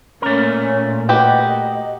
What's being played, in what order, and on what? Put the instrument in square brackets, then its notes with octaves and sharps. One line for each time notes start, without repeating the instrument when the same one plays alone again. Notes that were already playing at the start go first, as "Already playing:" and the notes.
[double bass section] A#2 [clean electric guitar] A3 A#4 [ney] C#4
[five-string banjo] F#4 G4 B4 [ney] D#5